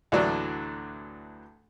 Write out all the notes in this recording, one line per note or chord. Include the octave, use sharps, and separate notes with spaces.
D2 A2 E3 F#3 D4